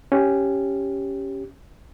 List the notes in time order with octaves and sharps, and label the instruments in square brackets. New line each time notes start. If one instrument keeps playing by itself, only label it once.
[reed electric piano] C#4 G4